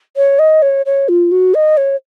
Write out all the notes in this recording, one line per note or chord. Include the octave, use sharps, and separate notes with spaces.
C#5
D#5
C#5
C#5
F4
F#4
D#5
C#5